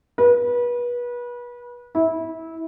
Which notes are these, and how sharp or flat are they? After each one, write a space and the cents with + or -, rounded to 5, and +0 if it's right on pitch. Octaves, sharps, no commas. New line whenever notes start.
B4 -30
E4 -20